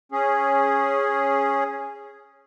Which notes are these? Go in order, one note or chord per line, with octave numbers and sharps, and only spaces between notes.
C#4 G#4